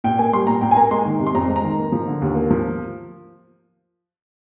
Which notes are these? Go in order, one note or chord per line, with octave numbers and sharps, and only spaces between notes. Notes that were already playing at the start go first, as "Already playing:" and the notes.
A#2 G5
A#3 G#5
G3 C6
A#2 A#5
A#2 G5
G#5
A#3 A#5
G#3 C6
D#3
C3
C6
F2 A#5
G#3
A#5
D#3
A#3
F3
D3
D#2
A#3
F3